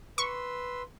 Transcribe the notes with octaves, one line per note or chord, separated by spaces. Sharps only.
B4 C6 C#6 E6